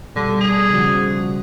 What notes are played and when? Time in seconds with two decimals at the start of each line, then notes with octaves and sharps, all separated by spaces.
0.16 B2 D3 G3
0.41 G#4
0.70 C#3 F3 F#4